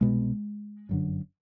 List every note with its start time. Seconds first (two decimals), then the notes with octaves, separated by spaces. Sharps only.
0.01 C2 B2 G#3
0.89 G1 F#2 D3